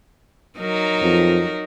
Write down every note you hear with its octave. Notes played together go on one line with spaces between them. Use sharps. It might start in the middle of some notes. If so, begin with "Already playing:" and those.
F#3 D#4 A#4
F2